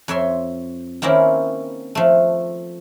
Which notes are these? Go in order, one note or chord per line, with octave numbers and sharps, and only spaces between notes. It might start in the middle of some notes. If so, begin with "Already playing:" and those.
F2 C#5 E5 C6
D#3 A#3 C4 C#4 E4
F3 A3